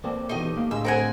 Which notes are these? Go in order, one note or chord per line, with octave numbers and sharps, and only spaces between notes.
A#3 C4 A4 D5
B2 E3 A3 D#4 G4 D#5
A#3 F5
A2 D3 G#3 D#5 F5 E6
C4 A#4 F#5 G#5